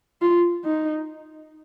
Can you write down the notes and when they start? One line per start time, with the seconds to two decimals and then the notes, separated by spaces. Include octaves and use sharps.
0.22 F4
0.64 D#4